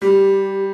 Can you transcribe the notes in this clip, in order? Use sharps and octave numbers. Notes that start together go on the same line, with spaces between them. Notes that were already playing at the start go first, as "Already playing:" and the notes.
G3 G4